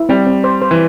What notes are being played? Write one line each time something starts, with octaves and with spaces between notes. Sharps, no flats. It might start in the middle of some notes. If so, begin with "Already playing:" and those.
Already playing: E4
G3 C4
C4
C5
C5
E3